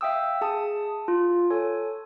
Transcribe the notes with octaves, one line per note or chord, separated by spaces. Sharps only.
E5 F5 G5 D#6 E6
G#4 A5 D#6
F4
A4 C#5 G#5